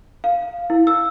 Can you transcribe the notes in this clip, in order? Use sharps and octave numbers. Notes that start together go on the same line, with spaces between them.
F5
E4
E6